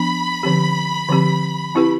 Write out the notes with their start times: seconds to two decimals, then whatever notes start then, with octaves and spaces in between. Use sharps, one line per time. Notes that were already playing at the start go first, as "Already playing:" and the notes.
Already playing: F3 B3 D4 B5
0.43 D3 F3 C4 G4
1.09 D3 F3 C4 G4
1.75 C4 E4 G4 B4